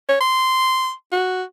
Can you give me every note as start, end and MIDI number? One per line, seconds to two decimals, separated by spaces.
0.09 0.16 73
0.21 0.92 84
1.12 1.43 66